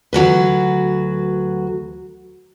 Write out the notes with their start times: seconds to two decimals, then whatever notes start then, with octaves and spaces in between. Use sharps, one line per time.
0.13 D2 F#3 F#4 B4